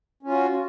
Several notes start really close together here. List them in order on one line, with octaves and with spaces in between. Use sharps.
C#4 F4 F#4